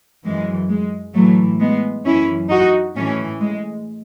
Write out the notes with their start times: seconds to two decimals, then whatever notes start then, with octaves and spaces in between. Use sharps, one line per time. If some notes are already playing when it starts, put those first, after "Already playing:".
0.24 F#2 E3 G#3
0.70 G#3
1.14 A2 E3 F#3 A3
1.60 G#3 B3
2.05 F#2 E3 C#4 E4
2.50 D#4 F#4
2.95 A2 E3 A3 C#4
3.40 G#3